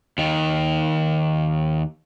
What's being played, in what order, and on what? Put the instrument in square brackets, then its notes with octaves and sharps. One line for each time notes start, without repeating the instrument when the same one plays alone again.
[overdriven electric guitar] D#2 D#3